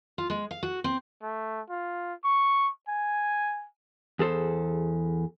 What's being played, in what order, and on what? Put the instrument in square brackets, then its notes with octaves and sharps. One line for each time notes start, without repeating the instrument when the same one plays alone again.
[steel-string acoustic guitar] F4
G#3
F5
F#4
C4
[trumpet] A3
F4
C#6
G#5
[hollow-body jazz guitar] E2 G#4 A4 C5